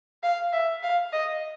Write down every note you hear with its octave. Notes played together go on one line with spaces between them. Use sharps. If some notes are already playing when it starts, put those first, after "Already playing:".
F5
E5
F5
D#5